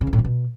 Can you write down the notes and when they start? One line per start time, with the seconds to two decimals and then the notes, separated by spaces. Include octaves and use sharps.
0.01 C#3
0.07 E2
0.13 A2
0.19 F3
0.25 B2